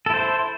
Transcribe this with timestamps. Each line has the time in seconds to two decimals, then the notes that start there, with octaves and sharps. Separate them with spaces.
0.06 A4
0.10 E4
0.14 C5